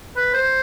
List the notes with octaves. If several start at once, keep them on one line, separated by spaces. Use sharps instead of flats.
B4
C5